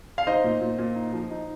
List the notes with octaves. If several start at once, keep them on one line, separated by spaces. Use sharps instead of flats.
F5
D#4 C5 D#5
A#2
A#2
A#2
D#4
F3
D#4